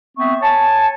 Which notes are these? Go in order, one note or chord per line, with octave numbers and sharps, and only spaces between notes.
B3 C4 E5 C#6
C#5 G#5 A5